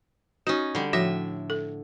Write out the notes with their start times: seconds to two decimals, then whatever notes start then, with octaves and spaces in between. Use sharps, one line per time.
0.47 C#4 D#4 F#4
0.75 D3 G3
0.93 A2 F3 F#4 E5
1.50 A4